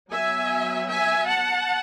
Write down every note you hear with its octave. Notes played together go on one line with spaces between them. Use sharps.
F#3 B3 E5 G#5
E5 G#5
F#5 A5